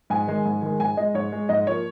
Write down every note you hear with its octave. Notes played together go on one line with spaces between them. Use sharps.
G#2 G#5
D#3 G#3
G#2
D#3 G#3
G#2 G#5
G#3 D#5
G#2 C#5
G#3
G#2 D#5
F3 A#3 C#5